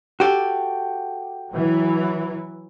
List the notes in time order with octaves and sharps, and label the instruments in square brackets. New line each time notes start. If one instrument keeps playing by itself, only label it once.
[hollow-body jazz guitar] F#4 G4 A4
[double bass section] E3 F#3